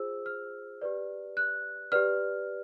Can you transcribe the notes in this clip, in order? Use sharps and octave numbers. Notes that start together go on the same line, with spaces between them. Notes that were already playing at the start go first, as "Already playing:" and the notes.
Already playing: F4 G#4 C5 E6
F6
G4 B4 D5
F#6
G4 B4 D5 F6